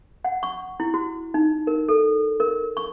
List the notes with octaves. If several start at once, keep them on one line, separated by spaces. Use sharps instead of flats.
F#5
C#6
E4
F#4
D#4
A#4
A4
A#4
C#6